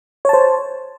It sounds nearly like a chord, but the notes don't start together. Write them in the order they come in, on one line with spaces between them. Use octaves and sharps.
C#5 A5 C5